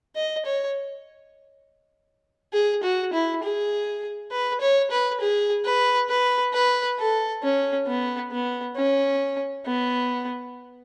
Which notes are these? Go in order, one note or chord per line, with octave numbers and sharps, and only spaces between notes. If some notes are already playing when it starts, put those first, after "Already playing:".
D#5
C#5
G#4
F#4
E4
G#4
B4
C#5
B4
G#4
B4
B4
B4
A4
C#4
B3
B3
C#4
B3